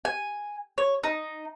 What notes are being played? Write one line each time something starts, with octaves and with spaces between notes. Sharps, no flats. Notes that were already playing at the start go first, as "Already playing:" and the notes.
G#5
C#5
D#4